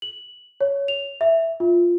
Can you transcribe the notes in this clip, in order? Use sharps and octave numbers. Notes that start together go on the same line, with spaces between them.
F#7
C#5
F7
E5
F4